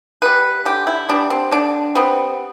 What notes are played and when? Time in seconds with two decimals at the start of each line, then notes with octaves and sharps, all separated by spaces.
0.22 G3 B3 B4
0.65 D3 G4
0.87 E4
1.09 G3 B3 D4
1.30 C4
1.51 D3 D4
1.95 G3 B3 C4